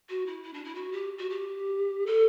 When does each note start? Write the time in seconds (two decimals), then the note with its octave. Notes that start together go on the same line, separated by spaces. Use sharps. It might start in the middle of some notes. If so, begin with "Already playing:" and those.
0.10 F#4
0.26 E4
0.43 E4
0.54 D4
0.64 E4
0.75 F#4
0.92 G4
1.18 F#4
1.30 G4
2.06 A4